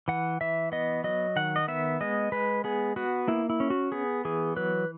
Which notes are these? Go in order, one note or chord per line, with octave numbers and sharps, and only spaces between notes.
E3 F#5
E3 E5
B3 D#5
F#3 D#5
D#3 F#5
D#5
B3 E5
G#3 D#5
G#3 B4
B3 G#4
B3 F#4
A#3 E4
E4
C#4
F#4
B3 G#4
E3 G#4
F#3 B4